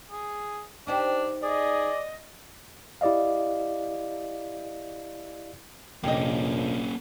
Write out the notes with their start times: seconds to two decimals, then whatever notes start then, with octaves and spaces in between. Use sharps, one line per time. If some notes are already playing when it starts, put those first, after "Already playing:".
0.11 G#4
0.87 D4 D#4 G4 C5
1.43 G#4 D5 D#5
3.01 E4 G4 D5 D#5 F5
6.04 F1 A#1 A#3 C#4 G4 D#5